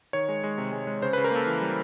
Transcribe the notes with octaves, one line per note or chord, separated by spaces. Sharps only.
D#3 C#5
G#3
G#3
C3
G#3
G#3
C#3 C5
C#3 B4
A#4
A#3 A4
E3
G3